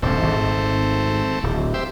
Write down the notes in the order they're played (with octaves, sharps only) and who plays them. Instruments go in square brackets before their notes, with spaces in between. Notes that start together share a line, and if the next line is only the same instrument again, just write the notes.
[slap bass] D#1 G2 [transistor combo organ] A3 C4
[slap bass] G#1
D1
[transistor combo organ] G4 C5 E5